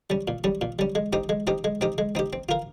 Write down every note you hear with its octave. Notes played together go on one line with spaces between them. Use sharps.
G3 C#4
A#2
G3 C#4
A#2
G3 C#4
G#3
C4 D#4 G4
G#3
C4 D#4 G4
G#3
C4 D#4 G4
G#3
C4 D#4 G4
C4
F4 A#4 F5